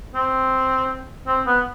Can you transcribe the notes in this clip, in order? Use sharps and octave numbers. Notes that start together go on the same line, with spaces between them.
C4
C4
B3